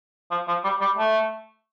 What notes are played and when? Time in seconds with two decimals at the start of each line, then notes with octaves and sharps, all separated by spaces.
0.31 F3
0.48 F3
0.64 G3
0.81 G3
0.98 A3